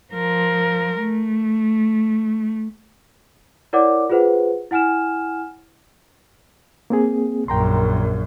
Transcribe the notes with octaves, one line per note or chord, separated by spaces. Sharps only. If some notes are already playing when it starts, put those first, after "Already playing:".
F3 A#4
A3
E4 A#4 C#5 D5 F#5 D6
F4 G#4 B4 C5 F#5
E4 F#5 G#5 F6 E7
A#3 C4 G#4
A#1 F#2 G5 A#5 C6